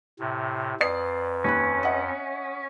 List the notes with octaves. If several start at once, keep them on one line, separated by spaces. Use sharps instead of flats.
A2 C3
F2 B4 D5 D#6 C7
D#2 C#4 B5 F#6
D#5 E5 F#5